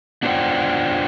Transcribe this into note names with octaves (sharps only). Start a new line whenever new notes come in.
B3 D4 F4 C5 F#5 G5